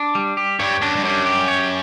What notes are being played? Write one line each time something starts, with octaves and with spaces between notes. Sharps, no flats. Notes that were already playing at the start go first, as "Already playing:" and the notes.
Already playing: D4
G3
G4
G2 C#5
F#2 D4
G2
F#2 G3
G4
C#5